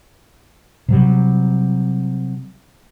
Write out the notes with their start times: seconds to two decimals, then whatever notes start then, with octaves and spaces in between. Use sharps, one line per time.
0.89 C3 F#3 G3